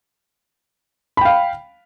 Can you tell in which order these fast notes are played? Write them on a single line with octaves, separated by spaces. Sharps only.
B5 G5 F5